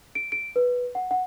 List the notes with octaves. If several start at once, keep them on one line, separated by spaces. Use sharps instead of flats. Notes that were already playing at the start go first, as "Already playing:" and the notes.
D7
D7
B4
F#5
F#5